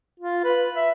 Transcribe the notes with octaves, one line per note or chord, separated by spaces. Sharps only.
F4
B4
E5